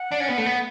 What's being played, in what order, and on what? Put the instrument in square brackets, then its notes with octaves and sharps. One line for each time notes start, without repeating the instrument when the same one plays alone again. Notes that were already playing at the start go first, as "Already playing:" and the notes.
Already playing: [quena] F#5
[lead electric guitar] D4
C#4
B3
A3
B3